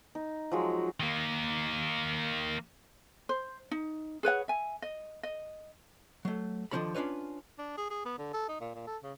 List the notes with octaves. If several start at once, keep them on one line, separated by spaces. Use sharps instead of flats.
D#4
F3 F#3 G#3
D#3 A#3
C5
D#4
G#4 B4 C#5 F#5
E5 G#5
D#5
D#5
F#3 A3
D3 D#3 F3 C#4 A4 B5
C#4 D4 F4 B4 C#5
D4
G#4
G#4
B3
D3
A4
D#4
A#2
A#2
A4
C#3